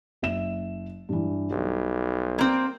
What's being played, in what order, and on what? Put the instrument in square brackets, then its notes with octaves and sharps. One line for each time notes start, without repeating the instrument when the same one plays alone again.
[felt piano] F#1 E5 E7
G2 E3
[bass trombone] B1 [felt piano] G3
[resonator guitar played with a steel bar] A#3 C4